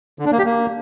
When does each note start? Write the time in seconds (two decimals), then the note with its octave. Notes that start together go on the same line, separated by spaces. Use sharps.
0.19 D3
0.26 D4
0.32 A#3
0.39 G4
0.45 A#3